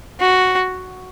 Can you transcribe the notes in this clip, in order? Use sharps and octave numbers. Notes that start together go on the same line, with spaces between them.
F#4